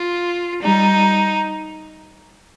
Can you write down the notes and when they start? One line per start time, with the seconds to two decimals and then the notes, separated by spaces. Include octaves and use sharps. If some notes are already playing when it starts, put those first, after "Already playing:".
Already playing: F4
0.61 G3 D#4